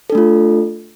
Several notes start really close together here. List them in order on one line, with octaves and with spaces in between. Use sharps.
A4 D4 A3 F4